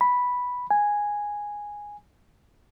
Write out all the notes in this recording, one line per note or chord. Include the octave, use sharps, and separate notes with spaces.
B5
G#5